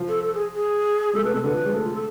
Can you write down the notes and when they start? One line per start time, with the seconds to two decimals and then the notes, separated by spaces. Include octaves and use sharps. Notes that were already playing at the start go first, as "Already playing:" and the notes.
Already playing: F3
0.08 A4
0.23 A4
0.34 G#4
0.54 G#4
1.13 G#3 A4
1.23 A3 B4
1.33 B2 A4
1.44 D3 B4
1.54 F3
1.64 G#3
1.73 A3
1.84 F4
1.94 A4